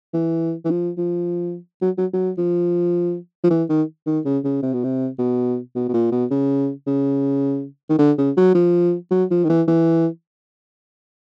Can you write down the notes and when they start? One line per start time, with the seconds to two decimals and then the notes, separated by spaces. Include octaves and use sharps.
0.13 E3
0.65 E3
0.70 F3
0.97 F3
1.82 F#3
1.98 F#3
2.13 F#3
2.38 F3
3.43 F3
3.50 E3
3.69 D#3
4.06 D#3
4.25 C#3
4.44 C#3
4.62 C3
4.73 B2
4.84 C3
5.19 B2
5.75 B2
5.88 B2
5.93 A#2
6.12 B2
6.31 C#3
6.86 C#3
7.90 D#3
7.99 D3
8.18 C#3
8.37 F#3
8.55 F3
9.11 F#3
9.31 F3
9.44 D#3
9.49 E3
9.68 E3